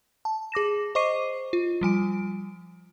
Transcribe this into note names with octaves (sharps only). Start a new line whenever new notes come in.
A5
G#4 D6 A#6 E7
C5 D#5 C#6 D6 C7 D#7
F4
F3 G3 G#5 D7